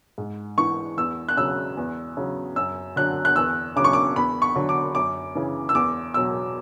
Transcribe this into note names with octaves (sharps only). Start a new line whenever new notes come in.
G#2
E3 C#6
E2 E6
F#6
C#3 F#3 E6
E2
C#3 F#3
F#2 E6
D3 F#3 F#6
F#6
E2 E6
C#3 F#3 D6
C#6
D6
E2 B5
C#6
D3 F#3
D6
F#2 D6
C#3 E3
E6
E2 D6
B2 F#3 E6